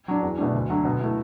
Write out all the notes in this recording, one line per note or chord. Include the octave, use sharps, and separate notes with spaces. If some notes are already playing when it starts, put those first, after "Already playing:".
F#3 D4
E2
B2 A3 D4
D2
D3 F#3
B2
A3 E4